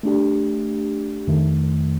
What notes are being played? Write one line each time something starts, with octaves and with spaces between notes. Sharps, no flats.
A3 D4 G4
F2 D#3 A3